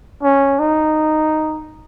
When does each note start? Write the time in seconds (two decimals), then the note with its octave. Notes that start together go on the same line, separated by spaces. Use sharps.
0.23 C#4
0.59 D#4